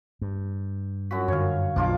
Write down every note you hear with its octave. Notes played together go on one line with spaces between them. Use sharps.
G2
F#2 F#4 B6
F#2 D3 C#5 F5
B1 D4 F4 D6